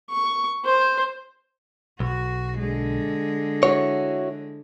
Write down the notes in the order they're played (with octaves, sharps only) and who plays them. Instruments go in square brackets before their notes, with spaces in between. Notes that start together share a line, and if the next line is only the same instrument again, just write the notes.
[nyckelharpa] C#6
C5
[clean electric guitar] B1 [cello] F#4
[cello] D3 G#3
[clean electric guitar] E4 F#4 C#5